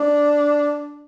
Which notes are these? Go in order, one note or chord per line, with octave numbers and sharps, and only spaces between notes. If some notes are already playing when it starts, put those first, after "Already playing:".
Already playing: D4